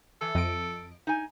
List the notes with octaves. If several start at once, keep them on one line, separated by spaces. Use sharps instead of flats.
E3 A4
F2 D#5 D7
D#4 G#5